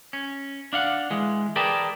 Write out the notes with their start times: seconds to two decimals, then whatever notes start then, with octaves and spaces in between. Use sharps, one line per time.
0.13 C#4
0.73 D4 F5 F#5
1.10 E3 G#3
1.56 G#4 A#4 B4 D5 G5 A5